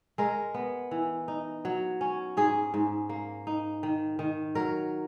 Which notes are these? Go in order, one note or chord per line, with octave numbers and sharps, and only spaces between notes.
G#3 A#4
B3
E3
D#4
F#3
C#4
G#2 G#4
G#2
A#3
D#4
D#3
D#3
F#3 A#4